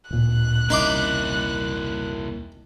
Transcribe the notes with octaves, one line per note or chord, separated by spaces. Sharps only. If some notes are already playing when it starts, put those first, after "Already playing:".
D1 A#2 F#6
E1 C2 A#3 C#4 D#4 E4 C6 D6